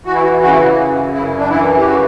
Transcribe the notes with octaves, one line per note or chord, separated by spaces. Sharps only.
E3 F#4
E4
F#4
C#3 F#4
E4
F#4
F#2
F#2 E4
D4
E3 E4
G4
C#3 F#4